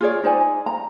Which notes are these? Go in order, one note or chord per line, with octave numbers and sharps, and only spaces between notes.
F4 G#4 C#5 D5
D#4 C5 D5 G#5
A#5